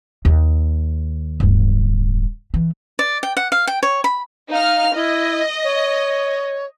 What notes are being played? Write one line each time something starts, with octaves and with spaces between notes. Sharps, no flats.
D#2
D1 G1
E3
D5
G5
F#5
F5
G5
C#5
B5
D#4 F5 F6
E4 D#5
C#5